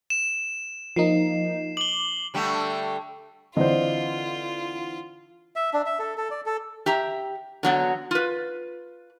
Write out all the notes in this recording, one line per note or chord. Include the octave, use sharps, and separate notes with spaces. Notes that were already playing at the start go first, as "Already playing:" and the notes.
E7
F3 A#3 D#4 C7
D6 F#7 G7
D3 G3 A3
D3 E3 C4 F4 C5 D5 D#5
E5
D4
E5
A4
A4
D5
A4
G4 E5 A#5
D3 F#3 B3
F4 B4